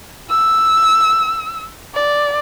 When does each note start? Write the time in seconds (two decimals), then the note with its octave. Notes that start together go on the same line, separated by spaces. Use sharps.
0.30 E6
1.94 D5